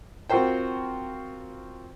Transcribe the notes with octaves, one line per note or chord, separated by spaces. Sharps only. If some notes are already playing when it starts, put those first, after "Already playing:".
C4 F4 F#4 A#4 C5 G5